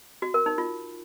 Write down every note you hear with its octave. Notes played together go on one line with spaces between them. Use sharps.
F#4
A#4
D#4
F4